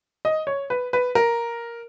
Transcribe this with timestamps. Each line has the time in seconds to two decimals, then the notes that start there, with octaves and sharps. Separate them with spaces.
0.25 D#5
0.47 C#5
0.70 B4
0.93 B4
1.15 A#4